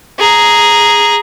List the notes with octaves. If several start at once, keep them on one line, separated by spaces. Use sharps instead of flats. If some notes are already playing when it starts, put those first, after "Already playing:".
G#4 A#5